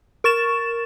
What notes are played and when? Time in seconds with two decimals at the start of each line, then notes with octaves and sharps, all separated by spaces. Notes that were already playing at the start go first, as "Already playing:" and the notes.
0.24 A#4 C#6 A6 E7